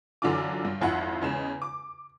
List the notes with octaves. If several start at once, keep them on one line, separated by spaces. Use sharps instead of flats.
F#2 D3 E3 D4 F4 D6
G2
G#1 F2 E4 F#5
E2 C#3 G#3 E7
D6